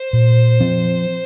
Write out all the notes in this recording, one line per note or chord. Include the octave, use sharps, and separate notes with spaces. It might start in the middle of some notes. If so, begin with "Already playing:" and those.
Already playing: C5
A#2
F3 C4